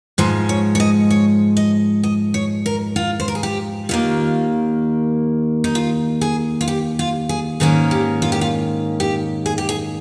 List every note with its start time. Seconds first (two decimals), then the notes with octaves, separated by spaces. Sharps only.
0.18 G#2 F3 G#3 C5
0.49 C#5
0.75 C#5
0.80 D#5
1.10 C#5
1.57 D#5
2.04 D#5
2.34 C#5
2.66 A#4
2.96 F4
3.20 C5
3.28 A#4
3.35 G#4
3.43 G4
3.89 D#2 D#3 A#3 F4
5.64 D#4
5.75 F4
6.21 G#4
6.61 F4
6.68 G4
6.99 F4
7.29 G#4
7.60 G#2 D#3 A#3 C#4 G#4
7.91 G4
8.22 F4
8.32 G4
8.41 F4
9.00 G4
9.46 G#4
9.58 G4
9.69 G#4